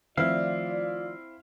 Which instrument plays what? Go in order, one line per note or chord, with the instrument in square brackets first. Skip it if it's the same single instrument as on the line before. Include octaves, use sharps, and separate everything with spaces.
[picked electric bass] D#3 F3 A3 [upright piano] C4 E4 [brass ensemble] F4 D5 [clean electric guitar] F5